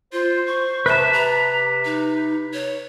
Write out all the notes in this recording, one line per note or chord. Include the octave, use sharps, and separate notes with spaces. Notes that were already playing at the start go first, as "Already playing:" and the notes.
F4 C5
C#6
C3 B4 E5 A5
A#5
D#4
C#5